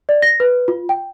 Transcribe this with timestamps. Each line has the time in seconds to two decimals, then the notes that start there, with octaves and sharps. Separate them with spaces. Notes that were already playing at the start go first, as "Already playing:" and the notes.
0.09 D5
0.22 A#6
0.40 B4
0.68 F4
0.89 G5